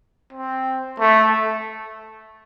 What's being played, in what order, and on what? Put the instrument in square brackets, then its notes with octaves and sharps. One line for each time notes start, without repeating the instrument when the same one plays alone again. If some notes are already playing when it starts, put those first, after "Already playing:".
[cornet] C4
A3